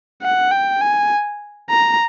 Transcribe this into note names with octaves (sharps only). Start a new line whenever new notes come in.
F#5
G5
G#5
A#5